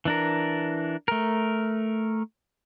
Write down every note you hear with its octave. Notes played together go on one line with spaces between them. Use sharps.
E3 D4 A#4
A3 A#4